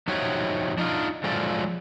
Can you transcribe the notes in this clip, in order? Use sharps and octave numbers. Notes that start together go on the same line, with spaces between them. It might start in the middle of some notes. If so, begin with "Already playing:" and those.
F3 D#4 F#4 G4 C#5 E5
D4 D#4 F4
F3 F#3 G#3 F4 A4 D5